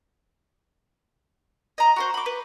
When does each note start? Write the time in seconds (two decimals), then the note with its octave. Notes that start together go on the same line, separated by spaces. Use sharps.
1.78 D#5 A#5
1.96 F#4 A#4 C5
2.14 B5 D6
2.26 B4